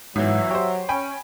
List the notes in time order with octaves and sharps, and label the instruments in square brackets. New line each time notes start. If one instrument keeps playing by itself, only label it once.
[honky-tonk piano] G1 E3 [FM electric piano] G#2 [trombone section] F#3 [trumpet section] E5
[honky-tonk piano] G4 C5 [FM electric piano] C#5
[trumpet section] C#4 [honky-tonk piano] G5 G#5 B5